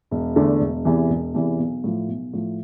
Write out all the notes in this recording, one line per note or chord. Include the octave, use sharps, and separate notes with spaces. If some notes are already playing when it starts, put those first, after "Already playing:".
E1
E2 D3 A3 D4
E1
E2 C3 E3
E1
E2 C3 E3
B1
A2 F3
B1
A2 F3